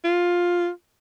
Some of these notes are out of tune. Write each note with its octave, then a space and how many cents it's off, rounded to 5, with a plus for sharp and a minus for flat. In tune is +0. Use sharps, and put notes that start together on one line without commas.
F4 +10